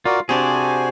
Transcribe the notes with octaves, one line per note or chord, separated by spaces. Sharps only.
F4 F#4 A#4 D5
C3 D4 F#4 G#4 C5 D5 G#5